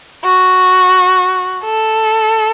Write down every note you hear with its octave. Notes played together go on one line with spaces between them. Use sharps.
F#4
A4